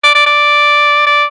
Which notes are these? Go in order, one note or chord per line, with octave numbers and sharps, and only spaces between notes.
D5
D5
D5
D5